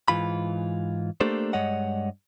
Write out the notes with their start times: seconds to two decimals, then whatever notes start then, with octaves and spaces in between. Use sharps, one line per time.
0.08 G#2 E3 F4 B5
1.21 A3 A#3 D4 G4 A4 C5
1.53 G2 G#3 C#5 D#5 F#5